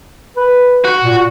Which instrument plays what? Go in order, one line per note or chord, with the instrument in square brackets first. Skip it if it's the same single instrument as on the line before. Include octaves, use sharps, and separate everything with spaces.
[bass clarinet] B4
[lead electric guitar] F#4
[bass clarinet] A#2